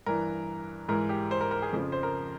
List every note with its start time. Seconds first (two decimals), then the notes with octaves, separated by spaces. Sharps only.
0.06 G2 E3 A#4
0.88 G#2 E3 A#4
1.09 G4
1.31 C5
1.41 A#4
1.51 A#4
1.62 G#4
1.73 F2 C#3 F3
1.92 C5
2.03 A#4